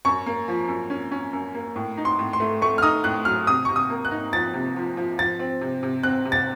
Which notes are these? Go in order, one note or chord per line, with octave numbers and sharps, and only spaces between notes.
F#2 C#6
A#3
F3
F#2
C#4
C#4
F#2
A#3
A2
D#4
C6
A2
C6
A3
A3 C#6
F6
D#4 D#6
A2 F#6
F#3 F6
C3 D#6
C3 C#6
D#6
A#3
F#6
D#4
F3 A6
C3
F3
F3
F3 A6
C4
C3
C3
C4 F#6
C3
A6